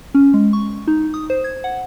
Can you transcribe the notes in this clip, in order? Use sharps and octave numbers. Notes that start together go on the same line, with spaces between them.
C#4
G#3
C#6
D#4
D#6
C5
G#6
F#5